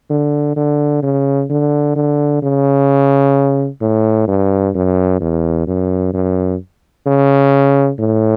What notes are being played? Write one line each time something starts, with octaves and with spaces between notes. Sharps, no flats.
D3
D3
C#3
D3
D3
C#3
A2
G2
F#2
E2
F#2
F#2
C#3
A2